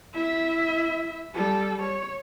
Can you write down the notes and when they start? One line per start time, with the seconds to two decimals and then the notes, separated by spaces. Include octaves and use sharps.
0.14 E4 E5
1.34 G3 A4
1.82 C#5